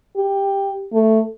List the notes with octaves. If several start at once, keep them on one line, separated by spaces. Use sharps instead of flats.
G4
A3